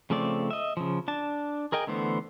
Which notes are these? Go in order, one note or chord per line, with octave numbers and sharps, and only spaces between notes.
C#3 F3 A3 C4 D5
D#5 E5
C#3 F3
D4 A5
G#4 A#4 D#5 G5 G#5
D3 E3 A3 B3 C5